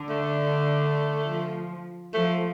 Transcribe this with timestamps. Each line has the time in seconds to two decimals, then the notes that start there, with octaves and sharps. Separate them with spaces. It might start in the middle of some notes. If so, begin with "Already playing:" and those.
Already playing: D3
0.09 A3
1.26 F3
2.13 F3 A3